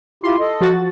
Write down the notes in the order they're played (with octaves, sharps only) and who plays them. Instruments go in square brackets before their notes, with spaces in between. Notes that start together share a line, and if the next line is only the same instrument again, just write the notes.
[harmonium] E4 F4 G4 [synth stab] C6
[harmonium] A4 D#5
[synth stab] F3 F#4 A6